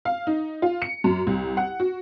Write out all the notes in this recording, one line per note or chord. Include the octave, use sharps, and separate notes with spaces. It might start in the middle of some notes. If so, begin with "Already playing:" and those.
F5
D#4
F4
C#7
F#2
C2
F#5
F#4